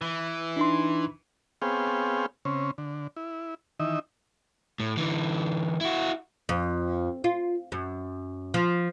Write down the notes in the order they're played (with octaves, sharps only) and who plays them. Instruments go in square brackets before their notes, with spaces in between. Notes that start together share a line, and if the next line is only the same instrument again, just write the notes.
[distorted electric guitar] E3
[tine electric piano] D4 D#4 C6
[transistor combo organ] B3 C4 G#4 C#5 F5 G5
C#3 C4 C#4
D3
E4
D#3 E3 D#4 E5
[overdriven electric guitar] A2
D3 E3
E4 F#4
[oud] F2
F4
F#2
F3